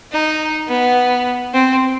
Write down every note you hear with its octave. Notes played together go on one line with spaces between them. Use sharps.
D#4
B3
C4